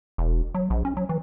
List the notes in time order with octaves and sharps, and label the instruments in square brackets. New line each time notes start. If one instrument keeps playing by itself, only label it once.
[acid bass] E1
F#3
A#1
C#4
F#3
E3